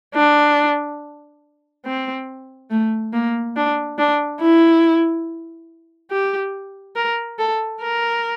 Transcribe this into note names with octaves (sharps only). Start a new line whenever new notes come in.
D4
C4
A3
A#3
D4
D4
E4
G4
A#4
A4
A#4